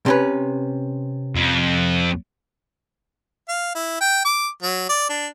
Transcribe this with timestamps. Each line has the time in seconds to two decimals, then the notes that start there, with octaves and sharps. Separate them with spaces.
0.06 C3 C#4 B4
1.35 F2
3.49 F5
3.75 E4
4.01 G5
4.25 D6
4.63 F#3
4.89 D5
5.09 D4